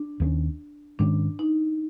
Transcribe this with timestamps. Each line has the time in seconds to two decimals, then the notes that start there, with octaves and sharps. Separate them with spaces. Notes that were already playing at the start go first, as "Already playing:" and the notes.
Already playing: D4
0.20 D#2 D#3 G#3 C#4
0.99 G#2 D#3 G#3 C#4 D4
1.39 D#4